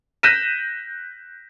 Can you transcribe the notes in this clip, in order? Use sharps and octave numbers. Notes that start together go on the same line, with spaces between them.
F#6 G6 A#6 B6 D#7 E7